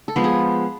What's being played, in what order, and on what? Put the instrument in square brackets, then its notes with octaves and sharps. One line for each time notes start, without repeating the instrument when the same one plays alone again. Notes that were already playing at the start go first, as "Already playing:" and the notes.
[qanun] A4
F3 G#3 B3
G#4